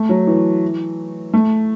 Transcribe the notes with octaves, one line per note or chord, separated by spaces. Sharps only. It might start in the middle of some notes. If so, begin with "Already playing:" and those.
Already playing: A3
F#3
E3
A3